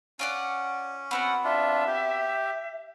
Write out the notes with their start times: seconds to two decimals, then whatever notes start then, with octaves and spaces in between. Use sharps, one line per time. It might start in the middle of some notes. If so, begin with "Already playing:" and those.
0.19 C#4 F4 D5 F#5
1.11 B3 C4 F#4 F#5
1.44 D4 F4 E5
1.87 G4